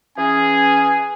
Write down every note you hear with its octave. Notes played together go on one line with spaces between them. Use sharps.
E3 C#4 G#4 G#5